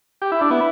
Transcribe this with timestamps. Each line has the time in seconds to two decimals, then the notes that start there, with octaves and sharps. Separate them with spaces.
0.22 G4
0.32 E4
0.41 D4
0.50 B3 E4